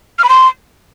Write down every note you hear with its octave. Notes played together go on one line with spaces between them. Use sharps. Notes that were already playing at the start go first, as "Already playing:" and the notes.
F6
B5
C6